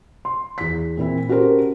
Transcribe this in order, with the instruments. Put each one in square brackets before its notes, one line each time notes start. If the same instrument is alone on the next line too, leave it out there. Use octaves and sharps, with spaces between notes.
[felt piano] C6
E2 B6
A#2 E3 C4 E4
C#4 F#4 G4 A4 A#4 C5